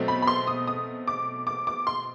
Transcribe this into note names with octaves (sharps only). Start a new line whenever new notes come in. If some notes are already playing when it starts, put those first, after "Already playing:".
Already playing: B2 F#3 A3 C4
B5
B5
C6
D#6
D#6
D6
D6
D6
C6